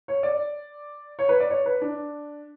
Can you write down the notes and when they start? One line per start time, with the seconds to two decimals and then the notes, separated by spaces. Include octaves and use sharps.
0.08 C#5
0.23 D5
1.19 C#5
1.29 B4
1.40 D5
1.50 C#5
1.66 B4
1.81 D4